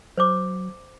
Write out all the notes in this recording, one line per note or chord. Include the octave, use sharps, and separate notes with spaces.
F#3 C5 C#5 D6